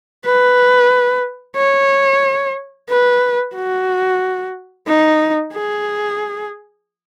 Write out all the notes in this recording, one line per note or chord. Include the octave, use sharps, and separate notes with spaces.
B4
C#5
B4
F#4
D#4
G#4